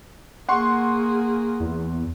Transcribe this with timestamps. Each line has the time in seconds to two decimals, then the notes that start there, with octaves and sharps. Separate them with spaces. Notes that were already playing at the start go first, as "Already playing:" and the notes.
0.49 A#3 G#4 F#5 C6 C#6
1.60 E2